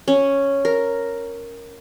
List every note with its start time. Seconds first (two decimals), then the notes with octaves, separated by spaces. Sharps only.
0.08 C#4
0.65 A#4